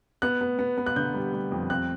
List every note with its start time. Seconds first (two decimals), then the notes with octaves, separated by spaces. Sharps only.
0.22 B3 F#6
0.41 B3
0.59 B3
0.78 B3
0.86 F#6
0.96 D3 G6
1.14 G3
1.33 G3
1.52 F2
1.70 C4 F#6